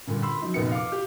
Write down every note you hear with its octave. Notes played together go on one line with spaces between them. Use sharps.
G2 A#2 D3
B5 C6 E6
F3 F#3 D#4
F1 A#2 B3 D#4 C#7
F5 D6
G4